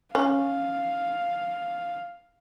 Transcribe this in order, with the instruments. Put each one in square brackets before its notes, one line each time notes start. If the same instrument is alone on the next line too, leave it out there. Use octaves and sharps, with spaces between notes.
[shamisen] C#4 [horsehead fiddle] F5